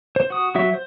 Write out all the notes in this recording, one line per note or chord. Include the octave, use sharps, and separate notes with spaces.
C5
F#4 D#6
F#3 F#4 E5
C5